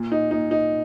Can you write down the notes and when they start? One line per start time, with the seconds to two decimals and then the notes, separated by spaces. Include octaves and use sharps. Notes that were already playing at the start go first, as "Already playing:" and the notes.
Already playing: A#2
0.12 D#4
0.31 A#2 D#4
0.51 D#4